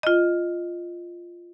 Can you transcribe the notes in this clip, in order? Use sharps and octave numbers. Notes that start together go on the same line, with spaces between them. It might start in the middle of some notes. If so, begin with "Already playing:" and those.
F4 D#5